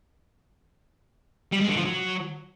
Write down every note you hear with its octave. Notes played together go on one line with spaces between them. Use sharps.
G3
G#3
D3
F3
F#3